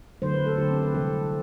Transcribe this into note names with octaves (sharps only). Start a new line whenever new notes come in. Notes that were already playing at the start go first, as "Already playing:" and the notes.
D3 F#3 A3 C5
B4
A4
D3 F#3 A3 G4
C4
B4
C3 E3 G3 A4